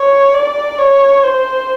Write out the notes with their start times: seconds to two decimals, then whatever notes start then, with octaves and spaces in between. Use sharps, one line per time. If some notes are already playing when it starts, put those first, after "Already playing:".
Already playing: C#5
0.34 D5
0.78 C#5
1.24 C5